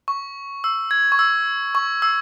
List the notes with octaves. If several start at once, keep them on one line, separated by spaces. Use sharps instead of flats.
C#6
E6
G#6
C#6
E6
C#6
E6